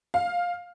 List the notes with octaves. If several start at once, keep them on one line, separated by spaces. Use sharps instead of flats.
F5